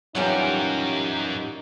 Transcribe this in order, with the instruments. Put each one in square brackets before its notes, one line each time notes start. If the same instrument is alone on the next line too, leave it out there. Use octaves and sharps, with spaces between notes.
[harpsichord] F#2 A#2 [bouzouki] E3 G3 C#4 [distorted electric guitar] F#3 A#4 [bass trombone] D#4